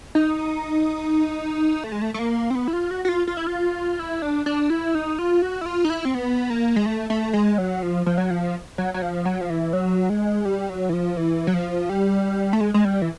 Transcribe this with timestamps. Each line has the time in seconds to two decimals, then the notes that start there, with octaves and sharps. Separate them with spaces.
0.15 D#4
1.84 A3
1.92 G#3
2.02 A3
2.14 A3
2.19 A#3
2.50 C4
2.55 B3
2.68 E4
2.73 F4
2.91 F#4
3.05 F#4
3.09 F4
3.27 F4
3.37 E4
3.47 F4
3.99 E4
4.22 D4
4.46 D4
4.70 E4
4.95 D#4
5.19 F4
5.42 F#4
5.61 E4
5.66 F4
5.85 D#4
5.90 E4
6.05 C4
6.15 B3
6.50 A#3
6.76 G#3
6.86 A3
7.10 A3
7.33 G#3
7.58 F#3
7.83 F3
8.06 F3
8.18 F#3
8.30 F3
8.78 F#3
8.94 F#3
9.02 F3
9.25 F#3
9.41 F3
9.50 E3
9.73 F#3
10.09 G#3
10.45 G3
10.69 F#3
10.89 E3
10.93 F3
11.17 E3
11.47 F#3
11.54 F3
11.89 G3
12.53 A3
12.61 G#3
12.74 G#3
12.85 G3
13.02 E3